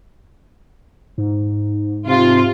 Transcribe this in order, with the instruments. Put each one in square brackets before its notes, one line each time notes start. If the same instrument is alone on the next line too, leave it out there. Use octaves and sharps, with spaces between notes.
[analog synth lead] G#2
[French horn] C3 [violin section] F4